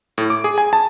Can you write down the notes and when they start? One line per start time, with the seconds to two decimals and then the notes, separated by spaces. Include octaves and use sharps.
0.18 A2
0.30 D6
0.44 G#4
0.58 G#5
0.73 A5